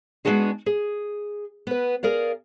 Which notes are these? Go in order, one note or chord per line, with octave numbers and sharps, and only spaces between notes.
G#3 A3 B3 D4 F#4 G#4
G#4
B3 B4
G#4 A#4 D5 F5